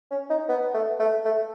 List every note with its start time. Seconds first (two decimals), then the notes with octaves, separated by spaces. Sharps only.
0.11 C#4
0.30 D#4
0.49 B3
0.74 A3
1.00 A3
1.25 A3